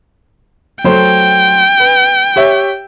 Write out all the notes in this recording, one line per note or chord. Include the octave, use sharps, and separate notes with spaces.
F#3 A3 C5 G5
B4
G4 C#5 E5